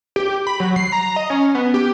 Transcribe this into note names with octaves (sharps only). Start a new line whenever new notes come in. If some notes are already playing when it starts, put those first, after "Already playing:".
G4
B5
F#3
C7
A#5
D#5
C#4
B3
G4